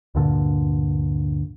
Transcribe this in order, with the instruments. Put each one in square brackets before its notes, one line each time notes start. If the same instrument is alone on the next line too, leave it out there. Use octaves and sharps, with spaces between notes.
[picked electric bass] D2 G2 A#2 D3